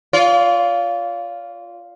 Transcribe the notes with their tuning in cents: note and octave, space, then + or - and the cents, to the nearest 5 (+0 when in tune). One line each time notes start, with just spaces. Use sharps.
F4 +0 D5 -45